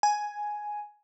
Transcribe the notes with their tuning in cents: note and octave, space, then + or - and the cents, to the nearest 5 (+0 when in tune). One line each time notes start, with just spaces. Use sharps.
G#5 +5